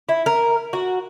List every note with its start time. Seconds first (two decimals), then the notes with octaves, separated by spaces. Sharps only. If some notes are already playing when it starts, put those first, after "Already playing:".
0.09 E4
0.26 A#4
0.73 F#4